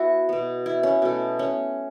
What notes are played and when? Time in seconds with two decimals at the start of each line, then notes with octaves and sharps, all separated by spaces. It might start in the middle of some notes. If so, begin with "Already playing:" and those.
Already playing: B3 E4 F#4
0.29 B2 B3
0.66 E4
0.83 C#4
1.02 B2 A3
1.39 C#4